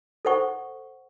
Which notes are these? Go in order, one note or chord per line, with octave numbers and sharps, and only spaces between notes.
A4 C5 F#5 C#6